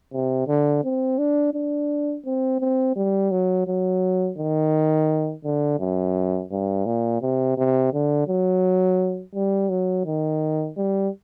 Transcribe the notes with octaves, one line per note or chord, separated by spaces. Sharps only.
C3
D3
C4
D4
D4
C4
C4
G3
F#3
F#3
D#3
D3
F#2
G2
A#2
C3
C3
D3
F#3
G3
F#3
D#3
G3